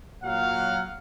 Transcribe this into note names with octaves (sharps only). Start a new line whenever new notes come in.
A#2 F#3 F5 F#5